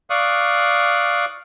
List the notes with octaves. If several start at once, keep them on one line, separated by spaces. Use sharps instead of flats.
D5 F5 C#6 D#6 F#6